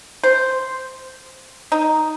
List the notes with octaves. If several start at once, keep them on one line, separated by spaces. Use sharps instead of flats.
C5
D#4